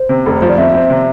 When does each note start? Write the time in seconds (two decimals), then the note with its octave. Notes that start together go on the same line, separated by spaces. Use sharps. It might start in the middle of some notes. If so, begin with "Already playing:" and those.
Already playing: C5
0.09 C3
0.26 F1
0.42 F3
0.49 D5
0.58 F2 E5
0.74 C4
0.90 C3